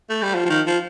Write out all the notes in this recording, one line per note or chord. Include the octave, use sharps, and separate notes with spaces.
A3
G3
F3
F3
D#3
F3